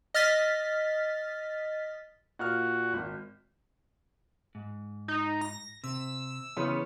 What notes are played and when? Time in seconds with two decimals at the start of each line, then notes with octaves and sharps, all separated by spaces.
0.14 D#5 F6 A6 B6
2.39 A#2 F#4 F6
2.94 G#1
4.55 G#2
5.08 D#4
5.41 A#6
5.84 C3 E6
6.57 C#3 E3 B3 C#4 C6